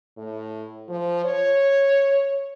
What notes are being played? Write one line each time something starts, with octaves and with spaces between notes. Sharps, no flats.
A2
F3
C#5